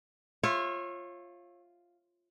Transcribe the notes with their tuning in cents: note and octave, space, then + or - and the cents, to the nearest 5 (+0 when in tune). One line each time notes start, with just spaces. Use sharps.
F4 +0 C#5 -30 E5 +0